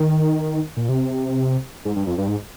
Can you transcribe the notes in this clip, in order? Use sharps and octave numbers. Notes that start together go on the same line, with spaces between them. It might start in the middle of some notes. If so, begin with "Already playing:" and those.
Already playing: D#3
A#2
C3
G#2
G2
F2
G2
G#2